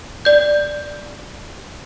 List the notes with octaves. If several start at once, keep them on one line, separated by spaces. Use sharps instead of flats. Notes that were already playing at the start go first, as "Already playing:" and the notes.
D5 G6